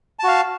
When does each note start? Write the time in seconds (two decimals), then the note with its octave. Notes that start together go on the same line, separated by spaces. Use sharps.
0.19 A5
0.24 F#4
0.28 F5